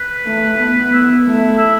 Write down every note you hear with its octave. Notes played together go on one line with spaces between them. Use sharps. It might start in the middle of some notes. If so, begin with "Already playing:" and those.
Already playing: B4
A3
B3
E4
A3 E4
E4